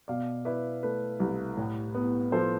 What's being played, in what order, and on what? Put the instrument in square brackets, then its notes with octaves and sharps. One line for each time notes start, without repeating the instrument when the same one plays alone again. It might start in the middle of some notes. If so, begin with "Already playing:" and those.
[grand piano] B2 D5 F5
E4 B4 D5
A3 B4
C2
A2
B3
F3 A4 C5